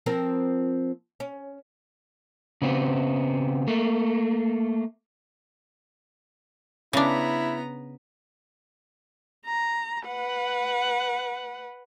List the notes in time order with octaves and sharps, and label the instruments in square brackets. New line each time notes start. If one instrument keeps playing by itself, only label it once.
[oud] F3 C4 A#4
C#4
[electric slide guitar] C#3 B3 C4
A3 A#3
[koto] C#3 D4 [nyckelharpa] B3 A#5 [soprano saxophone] E4
[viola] A#5
B4 F#5